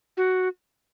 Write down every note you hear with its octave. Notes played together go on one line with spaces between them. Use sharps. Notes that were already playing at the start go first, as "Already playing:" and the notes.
F#4